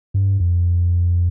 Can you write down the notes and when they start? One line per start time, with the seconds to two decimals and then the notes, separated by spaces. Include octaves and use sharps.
0.14 G2
0.40 F2